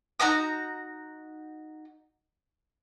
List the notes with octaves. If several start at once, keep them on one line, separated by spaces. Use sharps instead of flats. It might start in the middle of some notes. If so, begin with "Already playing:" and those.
D#4 F#4 A#5 D#6